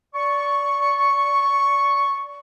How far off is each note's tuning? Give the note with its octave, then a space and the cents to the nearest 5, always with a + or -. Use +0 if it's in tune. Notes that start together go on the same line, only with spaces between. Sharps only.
D5 -25 C#6 +0